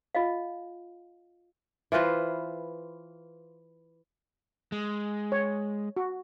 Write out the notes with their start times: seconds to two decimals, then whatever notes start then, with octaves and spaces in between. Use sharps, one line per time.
0.15 F4 D#5 F5
1.92 E3 F4 B4 C5
4.72 G#3
5.32 C#5
5.97 F#4